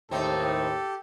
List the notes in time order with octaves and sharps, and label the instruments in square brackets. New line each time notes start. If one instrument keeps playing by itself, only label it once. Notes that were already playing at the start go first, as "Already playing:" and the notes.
[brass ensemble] D#2 A2 [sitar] C4 D#4 [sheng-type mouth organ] G4 [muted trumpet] A4